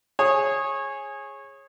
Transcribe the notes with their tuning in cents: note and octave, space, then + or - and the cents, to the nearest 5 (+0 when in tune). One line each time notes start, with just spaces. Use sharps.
G#4 +0 C#5 -20